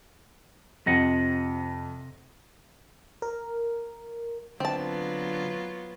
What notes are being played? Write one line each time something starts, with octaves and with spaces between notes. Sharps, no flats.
F2 C3 D#5 F#5
A#4
D3 F#3 B3 C4 F4 A5